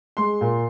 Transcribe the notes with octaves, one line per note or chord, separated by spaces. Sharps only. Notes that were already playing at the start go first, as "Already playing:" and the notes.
G#3 C6
A#2